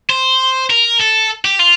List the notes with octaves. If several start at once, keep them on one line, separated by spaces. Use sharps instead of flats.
C5
A#4
A4
G4
F4